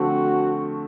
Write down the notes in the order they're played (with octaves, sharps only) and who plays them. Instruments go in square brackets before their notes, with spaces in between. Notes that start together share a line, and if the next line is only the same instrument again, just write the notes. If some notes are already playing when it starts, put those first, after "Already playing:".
Already playing: [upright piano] D3 F3 A3 C4 [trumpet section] F#4